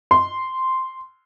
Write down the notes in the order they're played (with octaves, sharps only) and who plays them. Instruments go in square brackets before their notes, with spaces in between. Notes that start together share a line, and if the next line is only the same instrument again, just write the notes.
[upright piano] C6